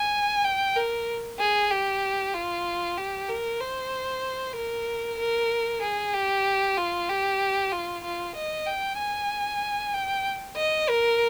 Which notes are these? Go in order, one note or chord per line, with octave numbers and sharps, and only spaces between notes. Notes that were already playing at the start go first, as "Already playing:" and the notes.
Already playing: G#5
G5
A#4
G#4
G4
F4
G4
A#4
C5
A#4
A#4
G#4
G4
F4
G4
F4
F4
D#5
G5
G#5
G5
D#5
A#4